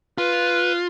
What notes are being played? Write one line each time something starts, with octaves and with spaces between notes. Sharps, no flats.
F4 B4